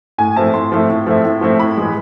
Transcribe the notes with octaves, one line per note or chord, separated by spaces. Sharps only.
A2 G#5
F3 A3 C4 E4 A5
A2 C6
F3 A3 C4 E4
A2
F3 A3 C4 E4
A2
F3 A3 C4 E4
A2 B5
E3 G#3